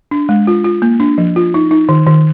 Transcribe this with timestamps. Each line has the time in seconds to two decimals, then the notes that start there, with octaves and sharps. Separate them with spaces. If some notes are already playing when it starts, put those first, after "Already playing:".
0.11 D4
0.29 G#3
0.47 F4
0.64 F4
0.82 A#3
1.00 D4
1.18 F3
1.36 F4
1.54 D#4
1.71 D#4
1.89 D#3
2.06 D#3